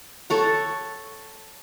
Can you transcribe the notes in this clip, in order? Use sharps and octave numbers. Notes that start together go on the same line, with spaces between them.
A4 C#5 F#5